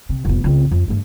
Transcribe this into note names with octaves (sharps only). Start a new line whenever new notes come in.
C3
F1 B3
C#2 C4
F2
G2 A3